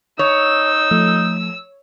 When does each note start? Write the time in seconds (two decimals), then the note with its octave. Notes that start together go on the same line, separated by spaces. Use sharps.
0.19 D#4 C#5 E6
0.91 F3 A3